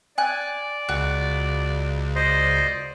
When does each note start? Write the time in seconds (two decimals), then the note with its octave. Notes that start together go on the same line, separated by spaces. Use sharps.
0.18 D5 G#5 F#6
0.89 C#2 F#4
2.15 C5 D5 D#5